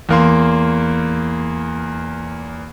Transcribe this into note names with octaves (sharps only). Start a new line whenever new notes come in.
E2 A#3 C6